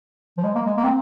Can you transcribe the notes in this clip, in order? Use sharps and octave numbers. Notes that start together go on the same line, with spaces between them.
F3
G#3
A#3
G#3
A#3
C4